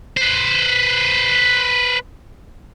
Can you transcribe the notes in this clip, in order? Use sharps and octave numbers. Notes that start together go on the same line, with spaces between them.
B4 C5